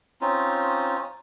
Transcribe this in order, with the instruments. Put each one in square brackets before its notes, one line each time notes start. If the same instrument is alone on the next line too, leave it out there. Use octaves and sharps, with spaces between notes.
[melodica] C4 C#4 D#4 F4